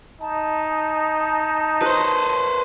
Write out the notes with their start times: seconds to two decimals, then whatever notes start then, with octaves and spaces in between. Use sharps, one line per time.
0.21 D#4 A5
1.82 B4 C5